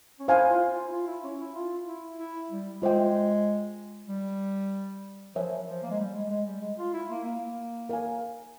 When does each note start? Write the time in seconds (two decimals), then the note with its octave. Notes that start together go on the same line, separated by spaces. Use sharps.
0.20 C#4
0.28 E4 C5 F5 G#5
0.50 F4
0.71 F4
0.87 E4
0.92 F4
1.07 E4
1.24 C#4
1.40 E4
1.55 F4
1.87 E4
2.19 E4
2.51 G3
2.82 G#3 F4 C5 E5 G5
4.08 G3
5.35 F3 A#4 C#5 E5 G#5
5.67 F3
5.83 A#3
5.91 G#3
5.99 G3
6.15 G#3
6.30 G#3
6.47 G3
6.62 G#3
6.78 F4
6.94 E4
7.10 A#3
7.25 A#3
7.89 A#4 F5 G#5